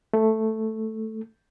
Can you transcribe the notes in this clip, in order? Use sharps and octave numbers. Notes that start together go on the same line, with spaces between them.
A3